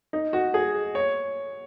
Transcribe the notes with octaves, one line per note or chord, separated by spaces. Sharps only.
D#4
F#4
G#4
C#5